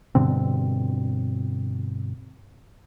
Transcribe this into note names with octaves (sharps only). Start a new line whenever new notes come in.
G2 B2 D3 C4